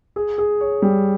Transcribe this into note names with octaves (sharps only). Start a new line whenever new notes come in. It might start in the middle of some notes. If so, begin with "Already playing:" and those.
G#4
G#4
C#5
G3